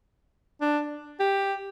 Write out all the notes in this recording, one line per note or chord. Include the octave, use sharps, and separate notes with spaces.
D4
G4